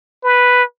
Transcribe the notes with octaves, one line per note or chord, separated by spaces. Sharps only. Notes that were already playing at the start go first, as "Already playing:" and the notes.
B4